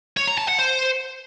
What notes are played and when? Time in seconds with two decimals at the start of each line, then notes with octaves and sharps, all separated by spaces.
0.17 C#5
0.27 A#5
0.38 A5
0.48 F#5
0.59 C5